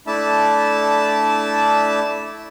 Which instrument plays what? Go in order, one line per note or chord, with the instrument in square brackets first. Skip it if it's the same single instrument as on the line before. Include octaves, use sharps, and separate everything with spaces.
[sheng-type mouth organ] A3 D4 E4 E5 A5